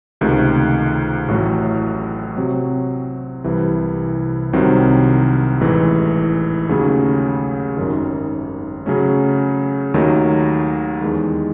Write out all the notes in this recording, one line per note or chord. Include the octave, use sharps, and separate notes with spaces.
C#2 C3 D#3 A3
A1 A2 F#3 A3
C3 F#3 C4
C2 C3 E3
C2 C3 D#3 F#3 C4
A1 G#2 E3 A3 D#4
D#2 C#3 F#3 A3 C#4
G#1 F#2 D#3
C#3 F#3 A3 C#4
D#2 D#3 F#3 A3 D#4
E2 D#3 G#3